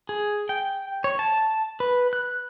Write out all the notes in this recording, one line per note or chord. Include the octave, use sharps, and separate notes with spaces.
G#4
G5
C#5
A5
B4
F#6